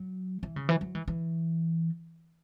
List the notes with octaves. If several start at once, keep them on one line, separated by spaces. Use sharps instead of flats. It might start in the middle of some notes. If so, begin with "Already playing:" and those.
Already playing: F#3
E3
C#3
E3
F#3
E3
E3